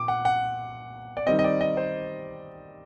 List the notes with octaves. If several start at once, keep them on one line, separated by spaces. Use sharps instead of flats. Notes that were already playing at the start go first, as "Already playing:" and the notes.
Already playing: A#2 D6
F#5
F#5
D5
D#3 G3 C4 D#5
D#5
D5
D#5
C5